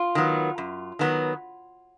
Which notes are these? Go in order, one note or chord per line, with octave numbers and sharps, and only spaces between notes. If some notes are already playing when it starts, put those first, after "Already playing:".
Already playing: F4
D#3 F#3 B3
F#2
D#3 F#3 B3